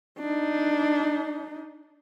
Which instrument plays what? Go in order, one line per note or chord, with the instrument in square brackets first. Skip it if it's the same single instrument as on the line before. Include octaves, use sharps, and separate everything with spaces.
[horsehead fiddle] D4 D#4